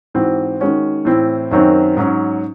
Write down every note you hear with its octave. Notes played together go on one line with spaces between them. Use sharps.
G#2 E3 C4 F#4
D#3 G#3 C#4 F#4
A2 E3 C4 E4
F#2 D#3 F#3 C4
G#2 F#3 C#4